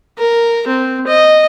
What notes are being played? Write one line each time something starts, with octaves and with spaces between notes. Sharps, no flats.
A#4
C4
D#5